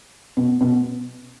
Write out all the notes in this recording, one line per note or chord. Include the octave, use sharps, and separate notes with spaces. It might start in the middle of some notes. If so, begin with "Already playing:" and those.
B2
B2